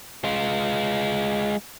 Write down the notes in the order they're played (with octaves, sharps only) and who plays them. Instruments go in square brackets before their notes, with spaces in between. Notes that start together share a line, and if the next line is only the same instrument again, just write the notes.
[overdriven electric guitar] G#3 F4